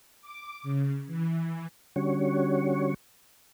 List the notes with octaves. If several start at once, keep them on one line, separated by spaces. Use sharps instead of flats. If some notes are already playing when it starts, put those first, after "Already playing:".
D6
C#3
E3
D3 G3 C#4 F#4 C#5